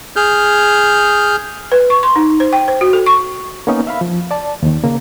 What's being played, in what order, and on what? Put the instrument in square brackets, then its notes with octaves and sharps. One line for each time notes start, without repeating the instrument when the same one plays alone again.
[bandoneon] G#4 F6 G6
[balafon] B4
C#6
C6
D#4
C5
G5
C5
F#4
A4
C#6
[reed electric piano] A#3 B3 C#4 D#4
E5 F5 B5
F3
D5 A5
D#2 D#3
C#3 A#3